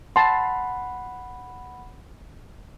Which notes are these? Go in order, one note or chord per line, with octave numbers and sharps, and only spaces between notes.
F#5 A5 B5 C6